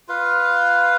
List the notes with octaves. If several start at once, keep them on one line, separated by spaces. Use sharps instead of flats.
F4 B4 F5